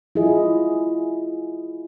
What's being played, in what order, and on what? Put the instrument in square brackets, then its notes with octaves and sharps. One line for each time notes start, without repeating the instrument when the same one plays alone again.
[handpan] E4 F4 G#4 D#5